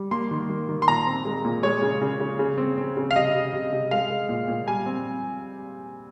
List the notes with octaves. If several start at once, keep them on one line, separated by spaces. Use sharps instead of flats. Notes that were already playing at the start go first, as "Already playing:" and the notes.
Already playing: G3
A#3 C6
D#3
A#3
D#3
C6
A#2 A#5
C4
G#3
A#2
G#3 C#5
C#3
C#3
C#3
C#3
C4
C4
C#3
F5
C3 D#5
C3
C3
C3
G#3 F5
G#3
A#2
A#2
G3 G#5
C4